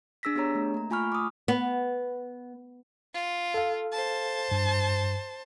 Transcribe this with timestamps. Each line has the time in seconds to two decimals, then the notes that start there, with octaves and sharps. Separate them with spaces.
0.23 D4 G#4 E6 A#6 B6
0.35 B3 D4 G4 G#4 C#5 A#5
0.55 A3
0.74 A#3 A#5
0.90 A3 F4 G#5 B5 C#6 F6
1.12 D6 D#6
1.48 B3
3.14 F4
3.54 A4 F5
3.93 C5 A5
4.51 G2